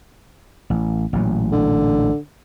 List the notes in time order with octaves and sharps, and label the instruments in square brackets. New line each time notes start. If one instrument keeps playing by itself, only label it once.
[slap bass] A1
A1 A#2 F#3
[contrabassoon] D3